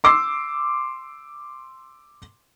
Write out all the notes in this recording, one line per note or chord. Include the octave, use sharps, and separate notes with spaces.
C6 D6 E6 C7